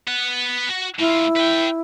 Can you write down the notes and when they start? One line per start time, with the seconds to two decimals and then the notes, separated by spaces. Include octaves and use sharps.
0.08 B3 F#5
0.69 F#4
0.99 A2 E4 F4
1.37 B4 G5